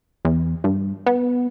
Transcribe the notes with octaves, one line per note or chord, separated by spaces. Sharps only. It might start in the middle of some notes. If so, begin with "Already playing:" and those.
E2
G2
B3